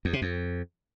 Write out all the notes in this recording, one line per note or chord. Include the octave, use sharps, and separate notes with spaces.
E2
C3
F2